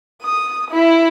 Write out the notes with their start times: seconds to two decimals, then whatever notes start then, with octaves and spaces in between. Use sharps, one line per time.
0.23 D#6
0.71 E4